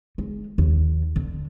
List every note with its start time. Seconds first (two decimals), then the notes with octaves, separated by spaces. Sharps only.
0.18 G#3
0.58 D#2
1.16 D3